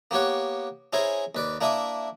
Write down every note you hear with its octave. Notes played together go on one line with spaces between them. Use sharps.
A#3 B3 G4 C#5 F#5
C#4 E4 G#4 A#4 C5
D#2 B4 D5
A#3 D4 E4 E5 D#6